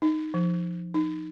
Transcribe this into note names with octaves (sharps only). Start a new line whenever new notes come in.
D#4
F3
D#4